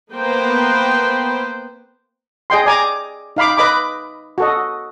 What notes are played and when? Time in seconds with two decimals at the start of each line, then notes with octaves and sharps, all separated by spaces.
0.13 A#3 B3 B4 C5 G5
2.50 G#4 D#5 G5 C6
2.66 D5 G#5 A#5 D6
3.36 D#4 F5 B5 D6
3.58 B4 D#5 B5 D6
4.38 F#4 A4 D#5